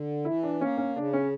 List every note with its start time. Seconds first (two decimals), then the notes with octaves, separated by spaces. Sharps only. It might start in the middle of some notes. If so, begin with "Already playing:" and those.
Already playing: D3
0.25 E3 E4
0.43 D4
0.61 A#3 C#4
0.78 C#4
0.96 C#3 D4
1.13 C#4